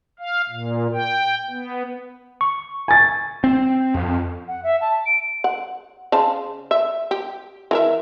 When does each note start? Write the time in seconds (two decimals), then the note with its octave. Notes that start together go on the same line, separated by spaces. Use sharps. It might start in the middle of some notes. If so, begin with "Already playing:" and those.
0.19 F5
0.49 A#2
0.94 G5
1.50 B3
2.41 C#6
2.88 G#5 A6
3.44 C4
3.95 F2
4.48 F#5
4.63 E5
4.81 A5
5.06 D7
5.44 F#5
6.12 C#3 C5 A5
6.71 E5
7.11 G4
7.71 E3 A#4 E5